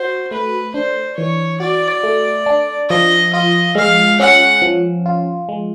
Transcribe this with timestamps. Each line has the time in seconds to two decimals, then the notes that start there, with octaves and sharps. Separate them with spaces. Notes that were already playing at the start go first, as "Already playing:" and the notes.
Already playing: F#4 C5
0.31 A3 B4
0.74 D4 C5
1.17 E3 C#5
1.60 F#4 D5
2.04 A3
2.46 D4
2.89 F3 D#5
3.33 F4 D#5
3.75 G#3 F5
4.20 C#4 F#5
4.62 F3
5.06 F4
5.49 G#3